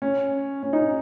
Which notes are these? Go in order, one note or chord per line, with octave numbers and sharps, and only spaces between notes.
C#4
C#4
D#4